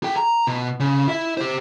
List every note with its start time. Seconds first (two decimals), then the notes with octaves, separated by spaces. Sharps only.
0.03 G#4 G5
0.16 A#5
0.47 B2
0.80 C#3
1.08 E4 E5
1.37 G4 C5